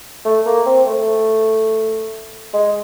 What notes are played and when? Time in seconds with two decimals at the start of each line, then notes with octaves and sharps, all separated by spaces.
0.25 A3
0.46 A#3
0.66 C4
0.87 A3
2.54 G#3